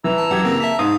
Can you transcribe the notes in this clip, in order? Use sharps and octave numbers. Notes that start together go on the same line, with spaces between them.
E3 A#5 E6
A5
F#2 G4 F#5 G#6
C#3 A#3 C4
E5 A5 B6
G#2 F5 D#6